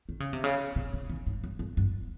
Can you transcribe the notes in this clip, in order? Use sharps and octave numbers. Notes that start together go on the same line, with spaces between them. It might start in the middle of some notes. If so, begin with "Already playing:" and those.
D#3
C#3
C3
C#3
C3
C3
D#3
G#2
G2
G2
G2